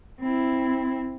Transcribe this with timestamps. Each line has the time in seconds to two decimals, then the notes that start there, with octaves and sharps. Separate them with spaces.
0.21 C4 E4